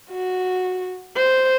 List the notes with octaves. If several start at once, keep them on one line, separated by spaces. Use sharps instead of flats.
F#4
C5